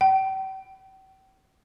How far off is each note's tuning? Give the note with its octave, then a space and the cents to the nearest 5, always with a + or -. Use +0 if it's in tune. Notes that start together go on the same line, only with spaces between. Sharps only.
G5 -40